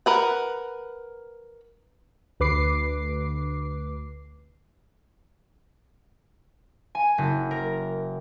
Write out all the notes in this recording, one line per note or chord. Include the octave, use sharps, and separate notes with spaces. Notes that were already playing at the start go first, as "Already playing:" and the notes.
A#4 B4 F#5
D2 B4 D6 C7
G#5
F#1
A#4